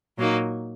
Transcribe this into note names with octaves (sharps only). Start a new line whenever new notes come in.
A#2 F#3 A#3 D#4